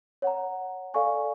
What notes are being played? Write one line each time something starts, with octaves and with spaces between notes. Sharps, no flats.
C#5 F#5 A#5
A4 D5 F5 G#5 C#6